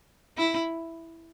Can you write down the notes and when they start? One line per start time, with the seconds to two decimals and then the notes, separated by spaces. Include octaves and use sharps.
0.38 E4